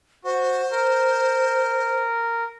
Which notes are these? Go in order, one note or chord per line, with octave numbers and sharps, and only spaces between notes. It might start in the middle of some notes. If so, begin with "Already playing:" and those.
F#4 C5
A#4